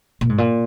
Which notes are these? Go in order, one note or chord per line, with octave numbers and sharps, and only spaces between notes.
A#2
G#2
A#2